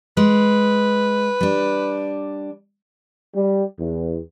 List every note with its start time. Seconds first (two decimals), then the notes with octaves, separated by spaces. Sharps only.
0.17 G#3 B4
1.41 G3 D4
3.33 G3
3.78 E2